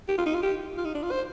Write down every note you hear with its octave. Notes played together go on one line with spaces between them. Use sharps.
G4
F4
D#4
F4
G4
F4
D#4
D4
F4
C5